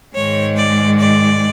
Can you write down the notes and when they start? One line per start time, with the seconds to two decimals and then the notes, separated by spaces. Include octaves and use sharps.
0.15 G#2 D#3 G#3 C#5
0.56 D5
0.98 D5